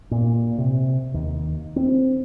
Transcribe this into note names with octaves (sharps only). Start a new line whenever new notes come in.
A#2
C3
D#2
C4